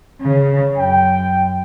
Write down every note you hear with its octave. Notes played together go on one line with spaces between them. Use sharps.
C#3
F#2 G5